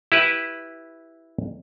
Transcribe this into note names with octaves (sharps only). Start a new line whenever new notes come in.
E4 G4 B4